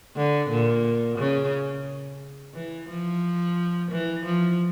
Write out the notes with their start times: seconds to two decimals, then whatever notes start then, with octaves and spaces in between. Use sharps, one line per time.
0.17 D3
0.50 A#2
1.18 C#3
2.54 E3
2.89 F3
3.91 E3
4.25 F3